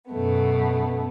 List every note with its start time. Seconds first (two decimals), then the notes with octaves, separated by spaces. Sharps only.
0.11 F#2 B2 A3 B3